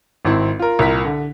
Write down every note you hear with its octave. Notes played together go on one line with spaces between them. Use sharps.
G#1 C4 E4
F4 A#4
C2 A#2 A#4 B6
D3